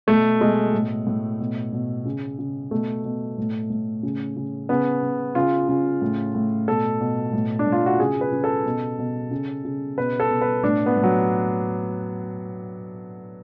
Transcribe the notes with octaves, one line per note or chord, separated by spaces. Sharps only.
B2 A3
B2 G#3
A2
A2
B2
B2
C#3
C#3
B2 A3
B2
A2
A2
C#3
C#3
C#3 B3
C#3
C#3 F4
C#3
A2
A2
B2 A4
B2
A2
D4
A2
F4
F#4
C#3 G#4
B4
C#3
A4
B2
B2
C#3
C#3
B2 B4
A4
B2
B4
A2 D4
B3
A2
F#3